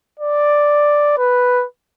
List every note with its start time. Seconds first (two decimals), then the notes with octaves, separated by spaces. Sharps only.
0.20 D5
1.18 B4